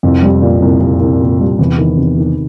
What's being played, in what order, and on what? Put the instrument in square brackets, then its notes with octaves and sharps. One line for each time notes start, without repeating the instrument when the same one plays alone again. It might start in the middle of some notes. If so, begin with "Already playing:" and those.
[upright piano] C2 [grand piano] F2
[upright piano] G3
A#2
C2
C2
C2
A#2
G3
[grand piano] E2 [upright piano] C3
[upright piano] D#3
C3
D#3